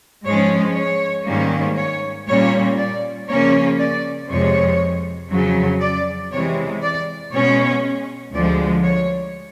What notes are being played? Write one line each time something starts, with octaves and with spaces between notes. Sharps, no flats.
G#2 F3 G#3 C#4 C#5
C#5
G#2 D#3 G3 A#3 C#4
C#5
A#2 G3 A#3 C#4 C#5
D5
C#3 F3 A#3 C#4 C#5
D5
F2 C3 F3 G#3 C#5
F2 C#3 F#3
D5
C3 E3 G#3 C#5
D5
B2 G#3 C#4 C#5
D2 D3 F3 G#3 D5
C#5